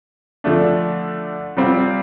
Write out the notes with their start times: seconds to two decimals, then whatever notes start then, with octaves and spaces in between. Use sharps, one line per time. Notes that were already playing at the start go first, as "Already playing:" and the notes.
0.44 D3 F3 A3 D4
1.57 C3 G3 C4 F4